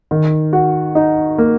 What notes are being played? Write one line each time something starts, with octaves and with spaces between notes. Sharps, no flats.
D#3
F#4
D#4
A#3